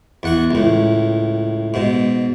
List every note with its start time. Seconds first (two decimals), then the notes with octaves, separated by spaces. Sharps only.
0.23 E2 F#5 C#6
0.51 C#2 A2
1.74 G#2 B2